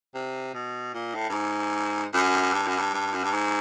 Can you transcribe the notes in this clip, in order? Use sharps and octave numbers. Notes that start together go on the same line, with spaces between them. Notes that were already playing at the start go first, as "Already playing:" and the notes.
C3
B2
A#2
A2
G2
G#2
F#2
G2
F#2
G2
G2
F#2
G2
G#2